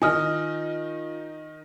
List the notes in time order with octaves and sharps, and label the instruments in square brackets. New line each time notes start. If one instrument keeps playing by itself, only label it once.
[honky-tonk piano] D#3 D#4 [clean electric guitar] F4 D#5 [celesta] G#5 D#6 F6